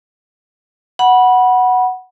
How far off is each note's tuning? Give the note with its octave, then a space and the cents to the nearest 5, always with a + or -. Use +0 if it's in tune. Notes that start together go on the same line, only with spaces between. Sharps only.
F#5 +0 B5 -20